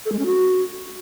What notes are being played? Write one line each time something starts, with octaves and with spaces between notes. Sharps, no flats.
A4
G#3
C#4
F#4